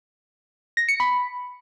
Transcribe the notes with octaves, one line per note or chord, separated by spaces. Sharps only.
A#6
C#7
B5